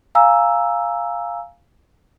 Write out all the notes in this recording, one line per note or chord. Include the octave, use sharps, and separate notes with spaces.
F5 G#5 A#5 E6